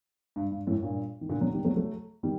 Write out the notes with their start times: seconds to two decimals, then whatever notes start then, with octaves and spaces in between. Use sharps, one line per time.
0.36 G2
0.51 G2
0.67 F#2 A2
0.83 G2 A#2
1.21 D#3
1.29 A#2 D3
1.41 D3 F#3
1.53 D#3 G3
1.65 F#3 A3
1.76 F#3 A3
2.23 D#3 G3